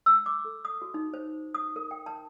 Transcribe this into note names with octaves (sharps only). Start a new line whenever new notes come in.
E6
D6
A4
D#6
F#4
D#4
C5
D#6
A#4
G5
A5